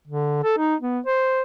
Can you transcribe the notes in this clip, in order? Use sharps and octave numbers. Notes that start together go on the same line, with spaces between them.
D3
A4
D#4
B3
C5